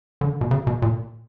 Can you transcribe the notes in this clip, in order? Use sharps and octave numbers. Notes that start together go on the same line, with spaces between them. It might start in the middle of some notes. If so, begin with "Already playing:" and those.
D3
B2
C#3
B2
A#2